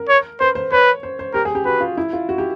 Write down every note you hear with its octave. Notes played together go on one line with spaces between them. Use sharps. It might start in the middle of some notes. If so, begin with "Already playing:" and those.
Already playing: A#4
C#5
B4 C5
C5
B4 C#5
C5
C5
G4 A#4
G#4
G4
F#4 B4
F4
E4
F4
F#4
G4